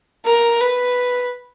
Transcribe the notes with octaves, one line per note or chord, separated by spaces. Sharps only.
A#4
B4